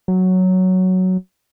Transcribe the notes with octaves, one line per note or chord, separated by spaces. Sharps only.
F#3